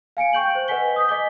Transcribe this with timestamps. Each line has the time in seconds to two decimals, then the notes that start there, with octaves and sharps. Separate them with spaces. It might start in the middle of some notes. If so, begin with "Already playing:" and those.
0.17 F5 G#5 C#7 D7
0.33 G5 C#6 G6 F#7
0.55 C5
0.68 B4 D#5 F#5 G#5 B6 G7
0.96 D#6 G6 B6
1.09 D#5 G#5 D6 B6 G7